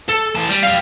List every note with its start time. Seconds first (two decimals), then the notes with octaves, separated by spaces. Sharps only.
0.09 A4
0.35 E3 A5
0.48 G3
0.63 G4 F5